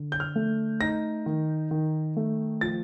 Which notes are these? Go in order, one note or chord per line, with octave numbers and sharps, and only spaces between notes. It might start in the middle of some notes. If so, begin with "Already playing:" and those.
Already playing: D3
G6
F6
A3
D#4 A#6
D#3
D#3
A3
F3 A6